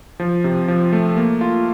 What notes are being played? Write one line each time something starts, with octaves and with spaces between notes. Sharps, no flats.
F3
C3
F3
A3
A#3
F4